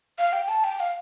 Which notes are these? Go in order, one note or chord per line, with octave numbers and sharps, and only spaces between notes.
F5
G5
A5
G5
F5